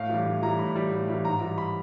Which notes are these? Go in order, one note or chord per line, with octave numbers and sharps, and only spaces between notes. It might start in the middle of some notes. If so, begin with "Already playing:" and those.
Already playing: A2 F5
E3 G3
A2
E3 G3 A#5
A2 B5
E3 G3
A2
E3 G3
G#2 A#5
E3 G3
B5